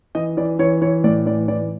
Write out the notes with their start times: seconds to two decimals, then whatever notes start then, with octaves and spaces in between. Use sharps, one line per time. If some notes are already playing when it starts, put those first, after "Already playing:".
0.15 E3 D#5
0.37 E3 D5
0.59 E3 C#5
0.82 E3 C#5
1.04 A2 D5
1.26 E3 D5
1.48 E3 D5